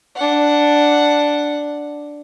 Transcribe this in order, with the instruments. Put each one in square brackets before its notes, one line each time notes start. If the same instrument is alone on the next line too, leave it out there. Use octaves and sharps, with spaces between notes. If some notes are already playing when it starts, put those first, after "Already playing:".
[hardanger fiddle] D4 F#5